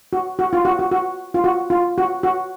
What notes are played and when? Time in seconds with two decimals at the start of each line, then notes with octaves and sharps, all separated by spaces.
0.13 F#4
0.39 F#4
0.53 F4
0.65 F#4
0.79 F#4
0.92 F#4
1.34 F4
1.44 F#4
1.70 F4
1.98 F#4
2.23 F#4